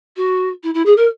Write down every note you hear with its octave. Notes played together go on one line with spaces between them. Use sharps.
F#4
E4
E4
G#4
A#4